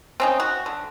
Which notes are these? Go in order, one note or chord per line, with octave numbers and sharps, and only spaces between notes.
C4 C#4 D#4
F#4
D3